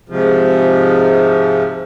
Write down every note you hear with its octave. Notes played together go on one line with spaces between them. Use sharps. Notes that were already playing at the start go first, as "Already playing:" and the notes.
G#2 C3 F3